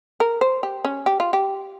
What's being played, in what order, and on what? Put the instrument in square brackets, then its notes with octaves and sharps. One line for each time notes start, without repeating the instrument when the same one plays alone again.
[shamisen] A#4
C5
G4
C#4
G4
F4
G4